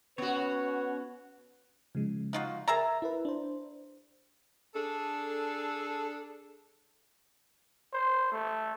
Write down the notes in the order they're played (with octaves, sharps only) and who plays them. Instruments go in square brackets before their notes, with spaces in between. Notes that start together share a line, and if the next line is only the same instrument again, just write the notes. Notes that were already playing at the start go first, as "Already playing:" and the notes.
[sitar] B3 F#4 [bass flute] C#4 [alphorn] B4 [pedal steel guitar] C#5
[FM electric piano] C#3 F3 G#3
[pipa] D#4 F4 F#4
[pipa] G#4 E5 A#5 [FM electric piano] A#4 A6
[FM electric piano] E4 A#4 B4
D4 C5
[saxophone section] D4 G#4 A4
[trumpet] C5
A3